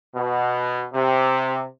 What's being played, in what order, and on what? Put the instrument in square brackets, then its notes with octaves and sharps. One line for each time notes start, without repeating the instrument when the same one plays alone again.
[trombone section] B2
C3